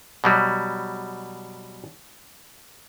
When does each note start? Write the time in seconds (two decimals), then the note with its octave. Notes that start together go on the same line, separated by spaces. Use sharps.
0.24 B2 F#3 G3